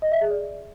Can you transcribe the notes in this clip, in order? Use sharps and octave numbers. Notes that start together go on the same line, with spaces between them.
D#5
E5
G#4
D5